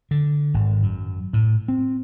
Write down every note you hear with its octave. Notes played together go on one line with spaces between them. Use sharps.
D3
G#1
F#2
A2
C4